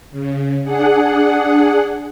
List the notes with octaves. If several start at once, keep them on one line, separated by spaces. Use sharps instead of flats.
C#3
D4 G#4 F#5